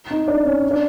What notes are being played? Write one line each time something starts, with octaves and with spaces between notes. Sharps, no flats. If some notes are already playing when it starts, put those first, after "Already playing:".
D#4
D4
C#4
D4